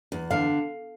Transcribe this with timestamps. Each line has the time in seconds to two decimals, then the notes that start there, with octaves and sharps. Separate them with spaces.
0.12 E2
0.31 D3 F5